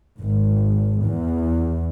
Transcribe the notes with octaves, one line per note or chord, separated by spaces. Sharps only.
G#1
E2